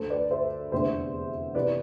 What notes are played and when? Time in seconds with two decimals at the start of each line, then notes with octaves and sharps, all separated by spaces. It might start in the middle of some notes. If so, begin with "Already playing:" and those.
Already playing: D2 D3 A4 C5
0.10 B4 D5
0.31 C5 E5
0.72 F1 E2 D3 C5 E5
1.55 C3 E3 B4 D5